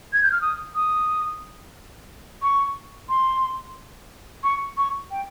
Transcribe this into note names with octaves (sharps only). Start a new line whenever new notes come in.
G#6
G6
F6
D#6
D#6
C#6
C6
C#6
C#6
G5